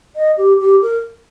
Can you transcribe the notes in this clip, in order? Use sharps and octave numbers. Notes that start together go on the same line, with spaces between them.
D#5
G4
G4
A#4